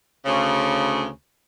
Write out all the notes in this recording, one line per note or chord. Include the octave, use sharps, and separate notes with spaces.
D2 C#3